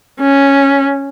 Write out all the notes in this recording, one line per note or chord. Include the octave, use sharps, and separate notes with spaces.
C#4